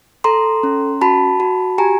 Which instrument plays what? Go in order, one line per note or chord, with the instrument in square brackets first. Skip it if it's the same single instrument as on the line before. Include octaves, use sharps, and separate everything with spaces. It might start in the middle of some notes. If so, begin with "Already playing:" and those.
[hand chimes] A4 A#5 C6
C#4
F#4 A5 B5
F#4
G4 G#5 A#5